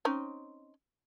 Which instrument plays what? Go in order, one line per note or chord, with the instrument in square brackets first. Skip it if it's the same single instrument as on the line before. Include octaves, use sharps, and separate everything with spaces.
[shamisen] C4 C#4 D#4